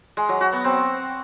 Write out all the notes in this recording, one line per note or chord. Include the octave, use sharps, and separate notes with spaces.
G#3
F#3
F#4
B3
C4